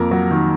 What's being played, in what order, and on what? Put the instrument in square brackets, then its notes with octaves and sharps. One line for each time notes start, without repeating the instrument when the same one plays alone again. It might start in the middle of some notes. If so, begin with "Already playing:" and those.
Already playing: [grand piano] F2 A#3 A#4
F#3
D#3